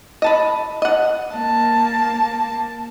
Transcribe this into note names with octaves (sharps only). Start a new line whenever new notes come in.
D#5 A5 B5
D#5 F#5
A#3 A5